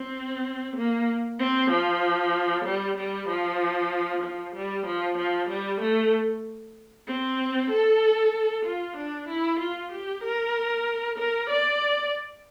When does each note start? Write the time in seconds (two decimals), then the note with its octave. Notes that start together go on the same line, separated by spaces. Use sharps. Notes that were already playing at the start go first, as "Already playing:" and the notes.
Already playing: C4
0.76 A#3
1.39 C4
1.70 F3
2.65 G3
2.97 G3
3.29 F3
4.23 F3
4.55 G3
4.86 F3
5.18 F3
5.49 G3
5.81 A3
7.08 C4
7.71 A4
8.65 F4
8.96 D4
9.28 E4
9.60 F4
9.92 G4
10.24 A#4
11.18 A#4
11.49 D5